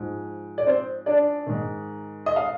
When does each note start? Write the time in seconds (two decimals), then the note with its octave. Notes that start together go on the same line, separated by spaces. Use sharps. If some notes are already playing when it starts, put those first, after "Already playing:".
Already playing: G#2 F3
0.58 D5
0.66 C4 C5
1.06 D4 D5
1.46 G#2 D#3
2.26 D#5
2.36 F5